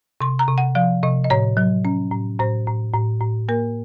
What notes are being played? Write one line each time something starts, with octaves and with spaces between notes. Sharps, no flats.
C3 C6
A#5
C3
F#5
F3 F5
C3 D#5
D#5
A2 C#5
F#3
C#4
A2
A2 C5
A2
A2
A2
A#3 A#4